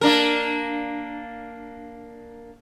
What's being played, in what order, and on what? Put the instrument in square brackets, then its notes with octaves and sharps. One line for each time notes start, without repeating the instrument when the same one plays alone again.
[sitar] A#3 D4 A#4